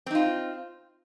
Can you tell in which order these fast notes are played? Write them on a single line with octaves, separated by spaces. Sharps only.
C4 D#4 F4